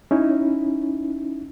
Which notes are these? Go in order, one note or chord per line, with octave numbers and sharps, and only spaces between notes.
C#4 D#4 E4